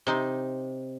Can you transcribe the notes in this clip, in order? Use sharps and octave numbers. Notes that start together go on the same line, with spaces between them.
C3 D#4 C6